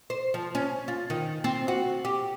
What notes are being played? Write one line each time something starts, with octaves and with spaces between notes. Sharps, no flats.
C5
F3
C#4
F4
D#3
C4
F#4
G4